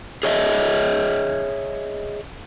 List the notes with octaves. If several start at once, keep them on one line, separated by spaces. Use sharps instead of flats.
G#4 C#5 D#5 E5